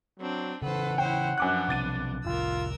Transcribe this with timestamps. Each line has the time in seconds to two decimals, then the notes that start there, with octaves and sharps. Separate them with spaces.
0.19 F#3 C4 D4
0.62 C#3 E3 A4 B4 C5 F#5
0.98 E4 C5 C#5 G5
1.38 F#2 F3 B3 D4 D6 F#6
1.69 B1 C3 D6 A6 D#7
2.26 F1 C2 F4 A#4 E6